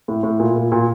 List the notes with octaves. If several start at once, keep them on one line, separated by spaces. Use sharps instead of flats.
A2
A2
A#2
A#2
A#2